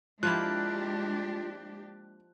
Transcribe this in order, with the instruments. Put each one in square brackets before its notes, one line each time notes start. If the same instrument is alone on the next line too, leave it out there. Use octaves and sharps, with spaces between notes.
[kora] F3 A#3 E4 [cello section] G#3 D4 G4 [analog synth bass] F4 [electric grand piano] F#6